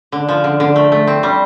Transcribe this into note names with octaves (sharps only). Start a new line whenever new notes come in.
D3
F3
D3
D3
A3
A3
C4
G3